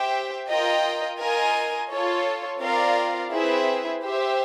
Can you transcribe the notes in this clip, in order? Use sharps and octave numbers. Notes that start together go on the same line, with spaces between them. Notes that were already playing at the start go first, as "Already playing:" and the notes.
Already playing: G4 C5 E5 G5
F4 A#4 D#5 G5
F4 A#4 D#5 G#5
F4 A4 C#5
C4 F4 A#4 D5 F5
C4 E4 G#4 B4 E5
G4 C5 E5